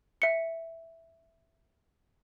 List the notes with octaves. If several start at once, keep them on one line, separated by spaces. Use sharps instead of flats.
E5 C#7